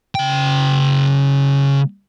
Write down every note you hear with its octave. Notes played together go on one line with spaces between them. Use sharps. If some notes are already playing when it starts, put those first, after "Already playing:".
C#3 G5